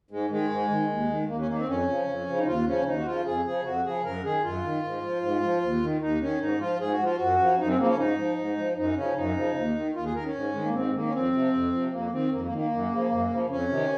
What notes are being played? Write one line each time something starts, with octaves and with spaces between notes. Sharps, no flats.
G#2 G#3
D#3 G#3
G#2
D#3
D#2
D#3
D#2 A#3
C#4
D#3 A#3
C4
F2 C#4
C#3 F3
F2
C#3 F3
D#4
D#2 F4
C#3 F3 C#4
D#2 D#4
F#4
C#3 F3 F4
F2 G#4
C#3 F3 G#4
F2 F#4
C#3 F3 G#4
F#2 A#4
D#3 G#4
F#2 F4
D#3
G#2
F3
G#2
F3
D#2
D#3
D#2 D#4
D#3 C#4
G#2 D#4
F3 F4
G#2 G#4
F#4
F3 F4
F#2 F#4
C#3 F3
F#2 D#4
C4
C#3 F3 A#3
C#4
G#2 D#4
F3
G#2
F3
F#2 D#4
C#3 F3 C#4
F#2 D#4
C#3 F3
D#2
D#3
D#2 F4
G#4
D#3 A#4
C#4
G#2
D#3 G#3
A#3
G#2 C4
G#3
D#3 A#3
C#4
F2 C4
C3 F3
F2
C3 F3
F2 A#3
D#3 C4
F2 A#3
A#3
D#3
A#3
F#2
C#3 F3
F#2
C#3 F3
F2 C#4
C3 D#3